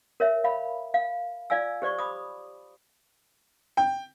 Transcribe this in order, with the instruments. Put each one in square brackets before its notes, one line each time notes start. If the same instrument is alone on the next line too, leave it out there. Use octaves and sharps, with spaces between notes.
[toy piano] A#4 C#5 E5
F5 B5
F5
F4 D5 F5 G#5 E6
G4 C5 D5 C#6
B5 D6 D#6
[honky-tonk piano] G5